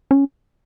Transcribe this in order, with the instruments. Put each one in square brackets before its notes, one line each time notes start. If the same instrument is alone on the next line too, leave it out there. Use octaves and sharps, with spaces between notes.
[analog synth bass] C#4